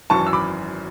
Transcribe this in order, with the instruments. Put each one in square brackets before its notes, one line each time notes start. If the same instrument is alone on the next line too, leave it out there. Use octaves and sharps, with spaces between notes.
[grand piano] G#1 F#2 E3 A5 C#6
E6
B5 D6